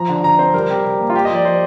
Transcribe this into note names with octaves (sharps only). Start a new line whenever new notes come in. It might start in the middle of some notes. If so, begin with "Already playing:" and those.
Already playing: F3 A#5
D3
D3 A#5
C4 C5
G3 A#4
C3 G4
C3
A#3
F4
A#3 G4
D#5
F3 D5
F3 C5